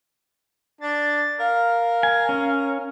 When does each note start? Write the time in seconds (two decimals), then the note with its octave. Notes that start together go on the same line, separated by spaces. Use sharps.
0.81 D4 A6
1.39 A#4 F5
2.03 G#5
2.29 C#4